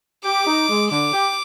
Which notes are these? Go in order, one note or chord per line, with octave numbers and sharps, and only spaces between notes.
G4 D6
D#4
G#3
D3 D6
G4